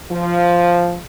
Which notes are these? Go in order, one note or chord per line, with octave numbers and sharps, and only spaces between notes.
F3